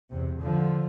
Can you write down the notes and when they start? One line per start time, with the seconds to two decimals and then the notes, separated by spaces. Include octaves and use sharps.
0.10 E2 C3
0.42 D3 F3